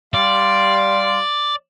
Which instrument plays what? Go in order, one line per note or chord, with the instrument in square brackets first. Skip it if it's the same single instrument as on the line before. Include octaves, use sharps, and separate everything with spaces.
[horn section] G3 F5 C6 [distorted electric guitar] D5